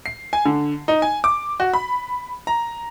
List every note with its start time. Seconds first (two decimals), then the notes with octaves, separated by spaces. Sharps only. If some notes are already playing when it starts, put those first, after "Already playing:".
0.06 C7
0.33 G#5
0.46 D3
0.88 D#4
1.02 G#5
1.24 D6
1.60 F#4
1.73 B5
2.47 A#5